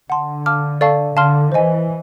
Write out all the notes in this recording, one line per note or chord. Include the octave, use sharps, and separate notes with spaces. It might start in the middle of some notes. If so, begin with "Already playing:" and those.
D3 F#5 A5 C6
F5 A5 D6 F6
A4 D5 F5 A5 C#6
D3 F5 A5 C6 F6
E3 C5 D#5 G#5